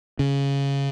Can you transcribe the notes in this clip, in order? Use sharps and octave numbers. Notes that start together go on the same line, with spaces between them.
C#3